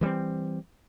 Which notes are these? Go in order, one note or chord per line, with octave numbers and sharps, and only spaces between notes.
E3 G3 G#3 C4